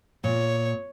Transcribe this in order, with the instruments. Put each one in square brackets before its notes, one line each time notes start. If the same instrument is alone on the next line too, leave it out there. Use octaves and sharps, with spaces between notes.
[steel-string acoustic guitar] A#2 [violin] C#5